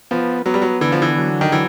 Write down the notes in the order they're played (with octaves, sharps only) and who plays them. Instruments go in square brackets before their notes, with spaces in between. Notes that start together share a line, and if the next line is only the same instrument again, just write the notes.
[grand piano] F3 [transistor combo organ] B3
[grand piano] F#3 [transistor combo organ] B3
[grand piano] G3
F#3
[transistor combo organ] D3 [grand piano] E3
[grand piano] F3
E3
[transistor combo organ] F#3
[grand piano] D#3
[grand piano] E3 [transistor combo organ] F#3